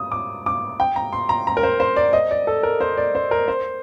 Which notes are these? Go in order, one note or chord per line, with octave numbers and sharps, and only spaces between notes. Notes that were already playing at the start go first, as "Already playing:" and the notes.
Already playing: D#6
D6
D6
G5
A#5
C6
A#5
A#5
A#4
C5
C5
D5
D#5
D5
A4
A#4
C5
D5
C5
A#4
C5